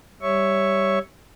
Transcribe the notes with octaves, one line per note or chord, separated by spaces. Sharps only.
G3 C#5 E5 C#6